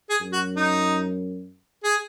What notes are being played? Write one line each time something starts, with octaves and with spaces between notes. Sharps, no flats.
G#4
F#2
F#4
D#4
G#4